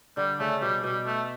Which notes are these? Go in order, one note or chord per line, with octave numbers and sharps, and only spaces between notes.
D3 G3
C#3 A3
B2 G3
B2 G3
A3